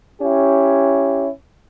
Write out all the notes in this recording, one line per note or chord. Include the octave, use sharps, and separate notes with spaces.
C#4 E4 G4